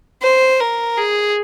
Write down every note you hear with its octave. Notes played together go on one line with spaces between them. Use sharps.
C5
A#4
G#4